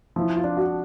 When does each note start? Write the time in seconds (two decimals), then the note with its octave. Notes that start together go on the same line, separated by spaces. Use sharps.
0.16 F3 E4
0.36 F4
0.44 D4
0.57 F#4